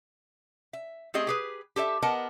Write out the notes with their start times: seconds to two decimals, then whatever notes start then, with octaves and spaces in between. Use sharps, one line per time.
0.73 E5
1.14 A3 C4 G4 G#4 D#5
1.27 G4 G#4 B4
1.76 G4 A4 C#5 E5
2.02 B3 A#4 D#5 F#5 A5